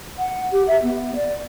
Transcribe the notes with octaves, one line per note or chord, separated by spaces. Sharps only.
F#5
G4
E5
B3
D5